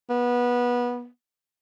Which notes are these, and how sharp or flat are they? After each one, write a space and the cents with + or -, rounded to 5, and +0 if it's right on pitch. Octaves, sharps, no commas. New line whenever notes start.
B3 -20